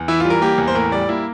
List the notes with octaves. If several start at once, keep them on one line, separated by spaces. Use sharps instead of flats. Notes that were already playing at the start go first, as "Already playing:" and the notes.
Already playing: E2
E3 E4
G3 F4
A#4
A#3 G4
E2
C5
A2 A#4
G3 D5
A#3 E4